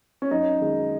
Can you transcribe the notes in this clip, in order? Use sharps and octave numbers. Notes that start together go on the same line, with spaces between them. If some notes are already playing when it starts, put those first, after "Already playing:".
C#4
F#2 D#4
D#3 G#3